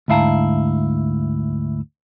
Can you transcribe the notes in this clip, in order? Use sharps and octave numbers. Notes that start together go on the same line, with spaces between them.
D2 G#2 E4 F5 A5 A#5